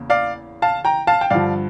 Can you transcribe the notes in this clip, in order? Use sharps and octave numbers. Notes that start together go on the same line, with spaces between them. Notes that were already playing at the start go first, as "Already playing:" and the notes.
Already playing: E2 C#3 A#3
D5 F5
F5 A5
G5 A#5
F5 A5
G5
G2 D3 F3 D5 F5